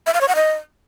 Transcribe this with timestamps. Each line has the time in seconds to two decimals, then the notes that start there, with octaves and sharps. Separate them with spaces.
0.07 E5
0.14 F5
0.21 C#5
0.28 F#5
0.35 D#5